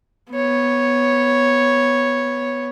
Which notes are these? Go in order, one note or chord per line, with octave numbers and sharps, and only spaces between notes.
B3 C#5